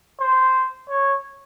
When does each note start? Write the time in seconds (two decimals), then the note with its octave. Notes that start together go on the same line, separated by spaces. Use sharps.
0.20 C5
0.89 C#5